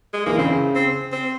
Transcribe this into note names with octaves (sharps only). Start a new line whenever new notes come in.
G#3
E3 A#3
C#3 C4
C4
C4